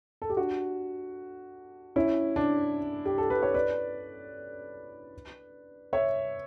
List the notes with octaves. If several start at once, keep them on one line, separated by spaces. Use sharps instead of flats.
A4
G4
D4 F#4
C#4 E4
D4
G4
A4
B4
C#5
B4 D5
C#5 E5